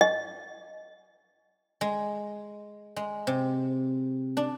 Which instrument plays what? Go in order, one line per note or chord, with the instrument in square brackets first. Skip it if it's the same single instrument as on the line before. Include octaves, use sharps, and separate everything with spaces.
[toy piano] D#5
[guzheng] G#3
G#3
C3
D4